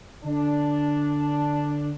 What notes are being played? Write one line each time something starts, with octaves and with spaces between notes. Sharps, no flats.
D3 D4